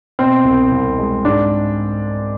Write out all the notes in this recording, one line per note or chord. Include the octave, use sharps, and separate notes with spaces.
B2 C4
C2
C2
G#3
G#2 D4